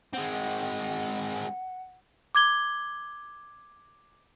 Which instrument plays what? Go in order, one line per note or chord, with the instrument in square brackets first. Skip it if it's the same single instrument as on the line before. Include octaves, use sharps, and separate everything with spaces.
[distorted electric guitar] G#3 C4 [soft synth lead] F#5
[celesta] D6 G#6 G7